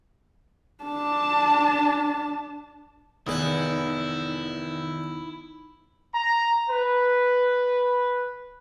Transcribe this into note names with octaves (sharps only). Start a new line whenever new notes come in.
D4 A5
F1 E2 D#3 D#4 E4 B4 F#5 G#5
A#5
B4